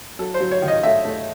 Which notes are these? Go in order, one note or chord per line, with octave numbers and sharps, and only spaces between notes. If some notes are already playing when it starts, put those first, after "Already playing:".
F#3 A4
C5
F#3
C#5
D#3
D#5
A3 E5
A3